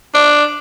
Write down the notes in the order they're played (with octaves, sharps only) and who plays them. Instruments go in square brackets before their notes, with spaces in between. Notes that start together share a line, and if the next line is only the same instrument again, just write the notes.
[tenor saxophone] D4